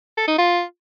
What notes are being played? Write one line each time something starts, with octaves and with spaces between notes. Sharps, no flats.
A4
D#4
F4